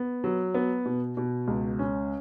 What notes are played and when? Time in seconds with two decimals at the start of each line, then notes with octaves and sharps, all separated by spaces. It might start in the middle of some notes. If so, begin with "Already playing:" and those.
Already playing: B3
0.24 F#3
0.54 B3
0.85 B2
1.17 B2
1.48 C#2
1.79 C#4